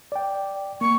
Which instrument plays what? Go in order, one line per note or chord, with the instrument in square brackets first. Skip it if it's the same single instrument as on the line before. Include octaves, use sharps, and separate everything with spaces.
[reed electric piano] D5 G5
[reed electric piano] A#3 [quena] C#6